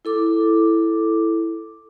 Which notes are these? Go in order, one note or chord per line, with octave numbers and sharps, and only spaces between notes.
E4 A4 D6